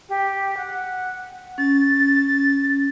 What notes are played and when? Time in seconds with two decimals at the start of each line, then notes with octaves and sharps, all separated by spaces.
0.09 G4
0.57 F#5
1.58 C#4 A6